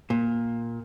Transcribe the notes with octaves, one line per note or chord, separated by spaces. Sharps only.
A#2